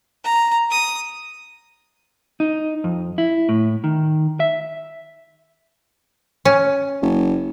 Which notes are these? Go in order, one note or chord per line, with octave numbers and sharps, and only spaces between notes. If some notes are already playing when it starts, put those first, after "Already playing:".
A#5
D#6
D#4
F2
E4
A2
D#3
E5
C#4
F#1